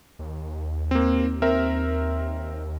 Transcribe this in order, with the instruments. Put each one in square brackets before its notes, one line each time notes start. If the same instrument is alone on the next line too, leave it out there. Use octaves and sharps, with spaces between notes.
[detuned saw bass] D#2
[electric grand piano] A#3 C4
C4 A#4 E5